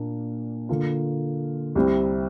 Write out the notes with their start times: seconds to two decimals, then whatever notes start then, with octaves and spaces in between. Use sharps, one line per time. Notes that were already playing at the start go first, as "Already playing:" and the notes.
Already playing: A#2 A#3 D4
0.69 D3 A#3 F4
1.75 C2 C3 G3 C4